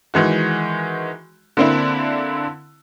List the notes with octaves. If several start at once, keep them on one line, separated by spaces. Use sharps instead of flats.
D#3 E3 G#3 F#4
D3 A#3 C4 D4 E4